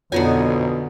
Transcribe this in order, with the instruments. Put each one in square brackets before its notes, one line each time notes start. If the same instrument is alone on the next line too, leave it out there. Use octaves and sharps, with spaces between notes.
[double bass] F2 D#4 [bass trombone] B2 [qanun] D3 B3 G#5 [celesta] F4 C#5